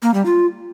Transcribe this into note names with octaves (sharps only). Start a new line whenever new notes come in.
A#3
G3
F4